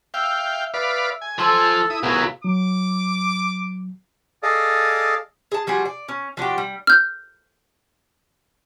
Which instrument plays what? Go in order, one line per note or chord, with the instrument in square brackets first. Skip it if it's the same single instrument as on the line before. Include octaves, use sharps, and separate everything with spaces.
[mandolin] E5 [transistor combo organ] F5 G5
[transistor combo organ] B4 D5 F5
G#5
[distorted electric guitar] F3 [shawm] A4 [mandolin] E6
[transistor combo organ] E4 D#6
[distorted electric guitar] C2 F#3 [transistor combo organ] B3 E4 [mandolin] F4 [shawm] G#4
[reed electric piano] F#3 [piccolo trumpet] D6
[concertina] G#4 A4 D5 D#5 F5
[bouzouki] G#4 A5
F3 G3 F#4 G#4
D5
C#4
F3 D4 F#4 G4
G3
[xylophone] F6 G6